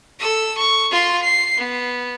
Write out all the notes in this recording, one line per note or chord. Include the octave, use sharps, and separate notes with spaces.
A4 E6
C#6
F4 C6
C7
B3